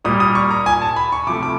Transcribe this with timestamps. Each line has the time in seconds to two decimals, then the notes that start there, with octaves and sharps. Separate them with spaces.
0.04 A#2 G3 A#3 D#6
0.20 D#6
0.35 C#6
0.51 A#5
0.66 G#5
0.81 A5
0.96 B5
1.12 C#6
1.27 C3 F3 A3 D6
1.43 D6